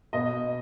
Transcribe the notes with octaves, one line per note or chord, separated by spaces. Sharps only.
B2 D#5